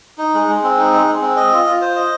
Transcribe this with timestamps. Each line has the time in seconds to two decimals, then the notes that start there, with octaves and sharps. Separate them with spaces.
0.18 D#4
0.34 G#3
0.49 G#3
0.64 C4
0.78 D#4
0.93 G#3
1.07 G#3
1.21 C4
1.36 D#5
1.52 F4
1.66 F4
1.82 C5
1.96 D#5